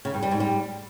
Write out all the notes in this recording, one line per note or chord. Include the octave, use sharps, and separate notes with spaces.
C#3
G2
G3
G#2
G3